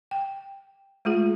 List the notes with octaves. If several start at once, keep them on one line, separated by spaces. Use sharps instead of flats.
G5
G#3 A3 F4 G#4